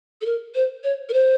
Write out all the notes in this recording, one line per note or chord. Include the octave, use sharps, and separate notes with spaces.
A4
A#4
C5
C#5
A#4
C5